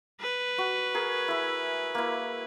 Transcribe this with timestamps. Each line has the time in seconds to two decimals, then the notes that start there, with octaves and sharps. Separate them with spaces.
0.21 B4
0.58 F#4
0.94 G#4 A#4
1.28 E4 E5
1.95 A#3 E4